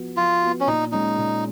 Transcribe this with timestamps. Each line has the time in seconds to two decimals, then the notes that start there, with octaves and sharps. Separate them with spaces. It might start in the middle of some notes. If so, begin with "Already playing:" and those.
Already playing: F3 B3 F#4
0.17 F3 F4
0.42 B3 F#4
0.61 C#4
0.67 A#2 D#4
0.92 G#3 C#4 D#4
1.18 A#2